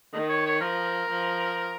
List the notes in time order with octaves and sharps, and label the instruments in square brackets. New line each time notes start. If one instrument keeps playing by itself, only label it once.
[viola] D#3 [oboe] D#5
[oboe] C#5
C#5
[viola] F3 [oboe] A#4
[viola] F3